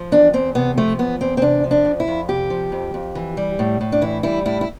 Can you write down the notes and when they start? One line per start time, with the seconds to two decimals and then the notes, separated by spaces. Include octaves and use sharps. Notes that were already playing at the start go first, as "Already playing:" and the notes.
Already playing: F3
0.12 E2 D4
0.33 E2 C4
0.55 C3 B3
0.78 F3 A3
0.99 E2 B3
1.21 E2 C4
1.37 C4
1.42 C3 D4
1.64 F3
1.71 D4
1.85 F2
2.00 E4
2.07 F2
2.28 C3 G4
2.50 F3
2.72 F2
2.94 F2
3.15 E3
3.37 G3
3.59 A2
3.81 A2
3.92 D4
4.01 E3 E4
4.23 G3 E4
4.46 A2 E4
4.61 E4